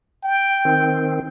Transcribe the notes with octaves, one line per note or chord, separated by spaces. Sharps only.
G5
D#3 C4